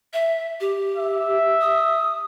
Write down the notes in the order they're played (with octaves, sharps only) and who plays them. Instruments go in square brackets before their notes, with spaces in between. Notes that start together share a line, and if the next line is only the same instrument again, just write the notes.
[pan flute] E5
G4
[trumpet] E5
[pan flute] D#6